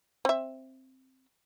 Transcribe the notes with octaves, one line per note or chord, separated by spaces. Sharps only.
C4 E5